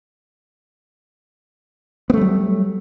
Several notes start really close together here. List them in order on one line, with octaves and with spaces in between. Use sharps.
B3 A3 G3 F#3